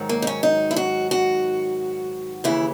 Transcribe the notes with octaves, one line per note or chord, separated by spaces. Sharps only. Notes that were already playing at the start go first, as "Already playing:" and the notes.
Already playing: G#2 D#3 F#3
A#3
D#4
C#4
D#4
E4
F#4
F#4
D#2 C#3 E3 E4